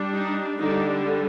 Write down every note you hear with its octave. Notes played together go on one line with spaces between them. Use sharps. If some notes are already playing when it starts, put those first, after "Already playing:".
Already playing: G3 D4
D#4
D3 G3 D4 D#4